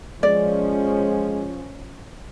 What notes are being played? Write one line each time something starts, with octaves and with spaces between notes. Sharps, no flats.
F3 G#3 C#4 D5